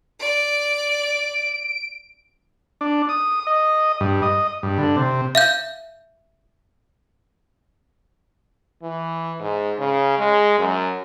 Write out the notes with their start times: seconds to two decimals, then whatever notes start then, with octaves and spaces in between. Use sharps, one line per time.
0.20 D5 D7
2.81 D4
3.09 D#6
3.47 D#5
4.01 G2
4.22 D#5
4.63 G2
4.78 D3
4.96 C3
5.35 E5 F5 G6
8.83 E3
9.40 G#2
9.79 C#3
10.18 G#3
10.59 F#2